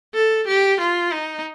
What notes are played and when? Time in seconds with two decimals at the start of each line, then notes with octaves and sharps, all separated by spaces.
0.14 A4
0.47 G4
0.80 F4
1.12 D#4